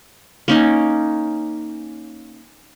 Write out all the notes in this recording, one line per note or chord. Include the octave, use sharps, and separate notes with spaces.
A#3 C#4 D#4